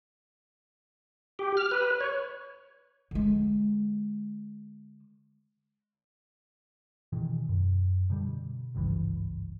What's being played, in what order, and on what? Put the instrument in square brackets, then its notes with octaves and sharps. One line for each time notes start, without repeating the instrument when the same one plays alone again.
[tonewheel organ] G4
F6
B4
C#5
[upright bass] D3 G#3
[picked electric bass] B2 D#3 E3
F#2
B2 D3 G3
G#1 C#2 G2 E3